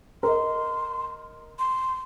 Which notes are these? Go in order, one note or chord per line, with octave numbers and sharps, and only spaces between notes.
A#4 D#5 C6
C6